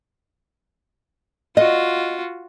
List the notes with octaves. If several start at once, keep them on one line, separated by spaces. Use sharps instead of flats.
F4 F#4 D#5